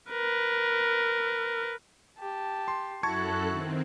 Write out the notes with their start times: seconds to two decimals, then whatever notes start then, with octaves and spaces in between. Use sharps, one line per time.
0.10 A#4 B4
2.19 G4 A5
2.68 C6
3.03 F#2 E4 F#4 A4 A5 C#6 F#6 G#6
3.49 D#3 C4